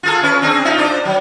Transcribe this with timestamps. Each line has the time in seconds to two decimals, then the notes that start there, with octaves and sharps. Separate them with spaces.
0.03 F4 G#4 A4
0.23 C#4 B4
0.42 C4 D4 G#4
0.65 D#4 F4
0.77 D4 C5 D5
1.05 F#3